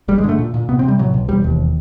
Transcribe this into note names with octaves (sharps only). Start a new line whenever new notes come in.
G1 G3
G#3
D3 A3
A#2
A#2
C3 B3
C4
C3
G3
A2 F#3
B1
E1 G3
D#2